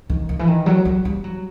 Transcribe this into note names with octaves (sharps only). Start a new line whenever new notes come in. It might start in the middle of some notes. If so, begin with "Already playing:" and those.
D#3
D#3
E3
D#3
F#3
F#3
G3
F#3